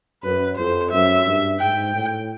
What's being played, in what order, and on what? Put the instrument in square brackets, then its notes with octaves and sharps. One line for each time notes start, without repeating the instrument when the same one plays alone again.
[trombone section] F#2 [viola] B4
[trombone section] F2 [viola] C5
[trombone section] F#2 [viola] E5
[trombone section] G2
[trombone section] G#2 [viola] G5
[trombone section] A2